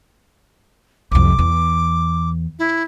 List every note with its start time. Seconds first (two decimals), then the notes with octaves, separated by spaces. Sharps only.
1.12 C2 F2 D6
1.39 E2
2.59 E4